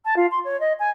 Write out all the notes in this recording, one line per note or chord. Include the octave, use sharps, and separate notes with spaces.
A5
F4
C6
C#5
D#5
G#5